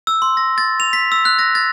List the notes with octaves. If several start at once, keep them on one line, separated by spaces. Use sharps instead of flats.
E6
C6
A#6
A6
F7
B6
E6
F#6
A#6
A6